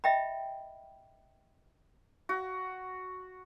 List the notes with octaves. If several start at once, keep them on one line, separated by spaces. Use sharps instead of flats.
D#5 E5 G5 B5
F#4